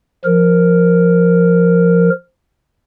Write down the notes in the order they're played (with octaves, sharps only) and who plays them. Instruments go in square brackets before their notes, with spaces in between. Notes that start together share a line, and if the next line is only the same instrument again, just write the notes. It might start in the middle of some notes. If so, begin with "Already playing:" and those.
[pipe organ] F3 A#4